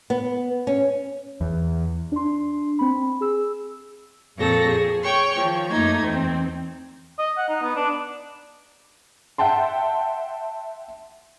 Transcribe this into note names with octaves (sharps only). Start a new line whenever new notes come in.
B3
C#4
E2
D4 C6
C4 B5
G#4 E6
F2 A#2 C4 A4 C#6 A#6
G#4
C#5 G5 C#6
D#3 F3
F#2 A3 A#3 D#4 G#6
E2 C4
D#5
F#5
D#4
B3
D4
E5 F#5 G5 A5 C6